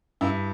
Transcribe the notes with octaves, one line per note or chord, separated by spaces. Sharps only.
G2 E4